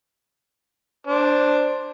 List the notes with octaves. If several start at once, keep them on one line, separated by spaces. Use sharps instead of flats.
D4 C5